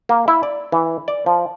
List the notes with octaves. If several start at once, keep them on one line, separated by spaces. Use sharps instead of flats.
A#3
E4
D5
E3
D5
F3